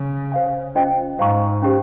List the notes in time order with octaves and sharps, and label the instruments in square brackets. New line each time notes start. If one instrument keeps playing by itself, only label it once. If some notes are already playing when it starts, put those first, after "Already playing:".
Already playing: [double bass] C#3
[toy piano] C5 F5 G#5
C#4 F4 C5 D#5 G5
[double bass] G#2 [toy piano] C5 F5 A#5 C#6
[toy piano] C#4 G4 C5